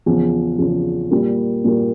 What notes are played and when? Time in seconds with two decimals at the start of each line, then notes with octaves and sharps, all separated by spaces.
0.06 E2 C#3 F3
0.58 E2 C#3 F3
1.11 A#2 G3 A#3
1.64 A#2 G3 A#3